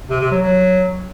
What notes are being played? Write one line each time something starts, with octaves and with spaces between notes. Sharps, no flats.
C3
C3
F#3
F#3